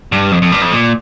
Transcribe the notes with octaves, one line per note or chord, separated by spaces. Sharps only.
G2
F2
F2
G2
F2
A#2